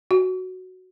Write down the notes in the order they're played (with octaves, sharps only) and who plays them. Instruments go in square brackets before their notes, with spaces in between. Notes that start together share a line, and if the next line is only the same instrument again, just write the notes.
[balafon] F#4